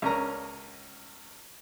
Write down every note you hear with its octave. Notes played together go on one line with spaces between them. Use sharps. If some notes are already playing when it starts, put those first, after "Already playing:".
C#2 C#4 D4 A#4 A#5